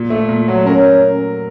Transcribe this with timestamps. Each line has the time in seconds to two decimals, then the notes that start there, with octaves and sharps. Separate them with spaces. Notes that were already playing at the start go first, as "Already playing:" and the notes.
Already playing: A#2
0.10 A3
0.29 A#2
0.48 F#3
0.66 C#4 A#4